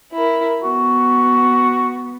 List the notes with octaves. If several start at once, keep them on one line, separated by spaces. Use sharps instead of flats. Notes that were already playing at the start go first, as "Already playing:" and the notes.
E4 A#4
B3 F#4